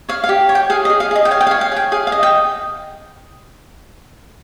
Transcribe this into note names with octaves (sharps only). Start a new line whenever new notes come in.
C#5 F5
F5
G4
C#5
G5
G#4 F5
D#5
G#4
F5
G#4 D#5
G5
C#5 F5
G5
F5
C#5
F5
G#4 G5
G#4 F5
F5
D#5
G5